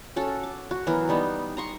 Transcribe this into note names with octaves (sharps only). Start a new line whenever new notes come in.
C#4 F#4 A4
D6
F#4
E3 F#3 B3 A#4
G3 B3 D#4
A#5 C6 C#6